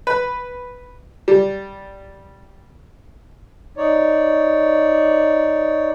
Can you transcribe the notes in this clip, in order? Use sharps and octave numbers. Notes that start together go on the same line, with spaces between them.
B4
G3
D#4 C#5 D5